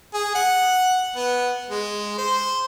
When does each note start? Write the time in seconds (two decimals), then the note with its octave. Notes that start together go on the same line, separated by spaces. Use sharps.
0.14 G#4
0.35 F#5
1.16 B3
1.70 G#3
2.18 C5